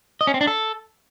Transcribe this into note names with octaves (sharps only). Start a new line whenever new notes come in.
D#5
C#4
C4
D4
A4